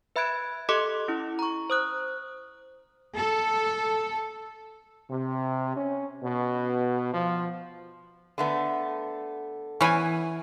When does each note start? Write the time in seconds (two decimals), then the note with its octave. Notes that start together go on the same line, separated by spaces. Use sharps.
0.16 B4 E5 B5 F#6 G#6 D7
0.69 G4 A4 D#5 C6 D6 F#6
1.08 C#4 E4
1.39 A#5 C#6
1.70 C5 D#6 F#6
3.16 A4
5.10 C3
5.76 C#4
6.23 B2
7.13 F3
8.38 D3 A3 B3
9.81 E3 B3 C#4 G#5